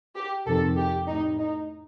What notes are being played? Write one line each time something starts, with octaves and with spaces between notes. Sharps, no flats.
G4
F2 C3 D#3 A4
G4
A2 D#4
D#4